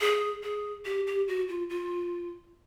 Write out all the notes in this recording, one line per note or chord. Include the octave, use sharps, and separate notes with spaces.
G#4
G#4
G4
G4
F#4
F4
F4